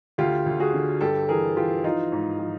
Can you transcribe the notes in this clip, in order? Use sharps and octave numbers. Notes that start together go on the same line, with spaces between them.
D2 F4 G4
D2
F#4 G#4
D3
G2 G4 A4
E3 G#4 A#4
E3 F4 G4
F3 D#4 F4
G#2
F3